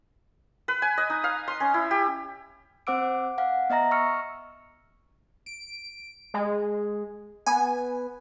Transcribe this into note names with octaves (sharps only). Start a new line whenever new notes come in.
B4
G#5
D#5
D#4
F5
C6
C#4
E4
G4
C4 C5 F#5 D6 E6 D7
F5 F#5
B3 D#5 E5 A#5 A#6
C#6 E6 F6 C#7
D7
G#3
B3 G#5